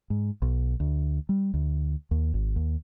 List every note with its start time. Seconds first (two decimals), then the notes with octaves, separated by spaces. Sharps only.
0.10 G#2
0.42 B1
0.80 D2
1.29 G3
1.54 D2
2.11 D#2
2.34 G#1
2.56 D#2